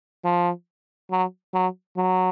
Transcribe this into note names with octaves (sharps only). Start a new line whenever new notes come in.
F3
F#3
F#3
F#3